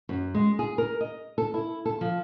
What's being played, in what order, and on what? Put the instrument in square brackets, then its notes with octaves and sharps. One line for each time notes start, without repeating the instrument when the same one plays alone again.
[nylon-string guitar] F#2
G#3
G#4
A#4
D#5
A4
E4
A4
F3